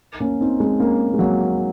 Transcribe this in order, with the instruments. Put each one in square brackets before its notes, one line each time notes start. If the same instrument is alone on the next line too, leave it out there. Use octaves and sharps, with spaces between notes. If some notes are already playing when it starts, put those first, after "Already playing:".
[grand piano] A#3 C#4
C4 D#4
G#3 C4
A#3 C#4
G#3
F#3 A#3